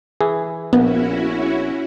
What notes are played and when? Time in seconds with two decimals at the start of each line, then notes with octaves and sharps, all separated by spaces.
0.21 E3 G#4
0.73 A#1 B3 C#4 E4 F#4